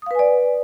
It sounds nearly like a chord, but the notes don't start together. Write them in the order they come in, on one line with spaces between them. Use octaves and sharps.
D#6 F5 B4 G#5 D5